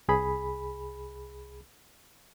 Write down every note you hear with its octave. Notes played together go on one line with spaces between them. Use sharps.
C2 G#4 B5